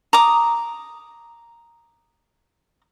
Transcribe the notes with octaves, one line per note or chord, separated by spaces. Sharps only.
A#5 D6 D#6